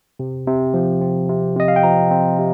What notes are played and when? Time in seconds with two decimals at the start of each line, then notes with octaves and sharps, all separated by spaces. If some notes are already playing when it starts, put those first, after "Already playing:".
0.20 C3
0.47 C3
0.74 F3
1.01 C4
1.29 C3
1.56 C3 D#5
1.68 F5
1.76 G5
1.83 F3 A#5
2.11 C4
2.39 C3